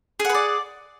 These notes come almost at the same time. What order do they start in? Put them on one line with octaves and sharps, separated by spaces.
G#4 F#5 B4 D5